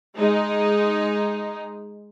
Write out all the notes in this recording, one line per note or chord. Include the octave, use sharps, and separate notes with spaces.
G#3 D#4